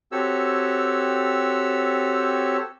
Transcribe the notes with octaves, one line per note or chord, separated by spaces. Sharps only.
C4 F#4 G4 A4 C#5 E6